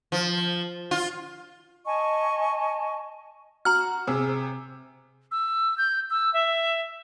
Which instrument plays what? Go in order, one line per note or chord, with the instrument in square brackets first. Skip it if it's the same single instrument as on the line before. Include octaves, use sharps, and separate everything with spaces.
[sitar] F3
F4
[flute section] D#5 G#5 A5 C#6
[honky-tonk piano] F#4 [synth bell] A#5 F6
[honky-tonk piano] C3 G#4 E6
[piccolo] E6
G6
E6
E5